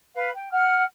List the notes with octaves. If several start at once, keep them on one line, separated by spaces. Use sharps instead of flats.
B4 F5
G5
F#5 F6